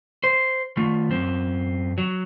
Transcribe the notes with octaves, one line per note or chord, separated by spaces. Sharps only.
C5
D#3 A3 F4
F#2 C4
F#3